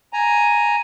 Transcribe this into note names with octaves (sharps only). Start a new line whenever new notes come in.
G#5 A#5